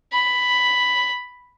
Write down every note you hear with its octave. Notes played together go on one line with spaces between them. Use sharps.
B5